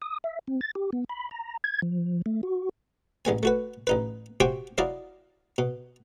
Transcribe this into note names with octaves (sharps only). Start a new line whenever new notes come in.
D#6
E5
C4
A6
G4
B3
B5
A#5
G#6
F3
A3
F#4
A1 G#3 B3 G#5
A3 F#4 B4
A1 D#4 B4
F#4 G4 C5 E5 G#5 D6
F#3 E4 D5 D#5 F5
B2